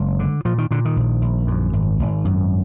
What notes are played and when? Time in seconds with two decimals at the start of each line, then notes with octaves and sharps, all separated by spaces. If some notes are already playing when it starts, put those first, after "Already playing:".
Already playing: F#1 G#3
0.19 D3
0.45 A#2 F3
0.58 D#3
0.71 A#2 D3
0.85 D#3
0.96 A#1
1.22 A#1
1.47 F#2
1.73 G#1
1.99 G#1
2.25 F#2